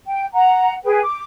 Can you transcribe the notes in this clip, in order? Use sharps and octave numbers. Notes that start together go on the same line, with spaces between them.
G5
F#5 A#5
G#4 B4 G5
D6